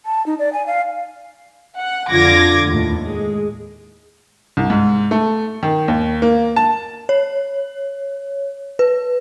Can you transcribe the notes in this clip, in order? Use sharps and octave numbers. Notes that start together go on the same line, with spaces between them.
A5
D#4
D5
G#5
F5
F#5
F2 D3 F4 D6 G#6 A#6
D#2 A2
G#3
C2
G#2
A3
D#3
D#2
A#3
A5
C#5
B4